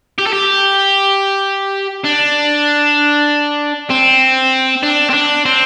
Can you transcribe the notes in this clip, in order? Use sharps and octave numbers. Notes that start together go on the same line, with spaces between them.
G4
A4
G4
D4
C4
D4
C4
D4
C4